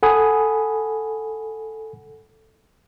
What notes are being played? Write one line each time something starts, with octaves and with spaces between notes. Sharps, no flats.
A4 F#5 G#5 B5 D#6